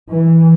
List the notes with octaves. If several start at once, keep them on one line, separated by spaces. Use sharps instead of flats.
E3